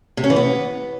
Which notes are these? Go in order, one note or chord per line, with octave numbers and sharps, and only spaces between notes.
C3
C#4
E3
B3